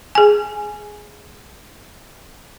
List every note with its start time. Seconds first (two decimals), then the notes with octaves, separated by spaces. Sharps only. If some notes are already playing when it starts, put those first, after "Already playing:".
0.15 G#4 G#5